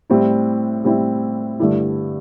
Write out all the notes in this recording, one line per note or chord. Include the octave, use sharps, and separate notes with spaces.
A2 G3 C4 E4
A2 G3 C4 E4
G2 D3 A3 E4 G4